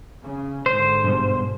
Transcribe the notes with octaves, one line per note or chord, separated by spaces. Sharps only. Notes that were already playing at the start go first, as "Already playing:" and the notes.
C#3
G#2 D3 C5
G2 B2 G3